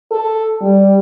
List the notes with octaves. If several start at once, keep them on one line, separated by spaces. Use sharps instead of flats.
A4
G3